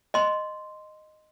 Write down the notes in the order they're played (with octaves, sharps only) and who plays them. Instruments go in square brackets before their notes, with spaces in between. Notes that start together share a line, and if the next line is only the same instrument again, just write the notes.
[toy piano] D#5 C6